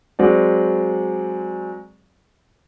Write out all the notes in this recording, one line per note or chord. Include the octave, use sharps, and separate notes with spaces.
F#3 G#3 C4 D5